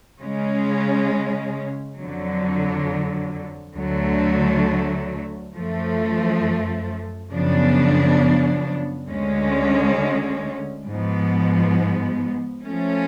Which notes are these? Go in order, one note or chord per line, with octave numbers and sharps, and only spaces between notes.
C#3 G#3 C#4
F2 D3 F#3
D2 D3 F#3 A3
F#2 F3 A3
F#2 C#3 F3 B3 D4
D2 D3 G#3 C#4
G#2 F3 B3
F3 A3 C#4